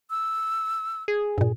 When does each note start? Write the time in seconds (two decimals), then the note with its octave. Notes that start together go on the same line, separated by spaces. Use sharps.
0.10 E6
1.08 G#4
1.38 G2 A#2